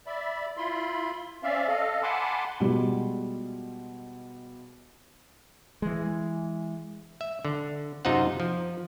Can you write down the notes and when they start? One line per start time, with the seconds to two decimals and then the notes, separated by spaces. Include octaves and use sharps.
0.07 D5 E5 B5
0.57 E4 F4 B5 C6
1.43 C4 C#4 D5 E5 F5
1.68 A4 D#5 F5
2.03 F#5 G#5 A5 B5 C6 D6
2.60 B2 G3 G#3 F4
5.82 E3 G#3
7.21 E5
7.45 D3
8.05 F#2 C3 D#4 F4 C5 F#5
8.40 F3